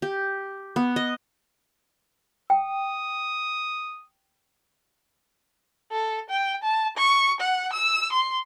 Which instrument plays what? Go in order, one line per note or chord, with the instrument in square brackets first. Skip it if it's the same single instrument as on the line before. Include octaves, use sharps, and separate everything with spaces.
[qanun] G4
B3
D#5
[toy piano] G5 [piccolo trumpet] D#6
[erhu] A4
G5
A5
C#6
F#5
E6
C6